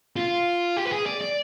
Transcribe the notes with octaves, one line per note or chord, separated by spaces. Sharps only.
F4
G4
B4
G#4
D5
D5